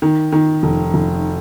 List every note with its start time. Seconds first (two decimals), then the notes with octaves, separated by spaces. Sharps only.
0.02 D#3
0.32 D#3
0.63 F1
0.94 F1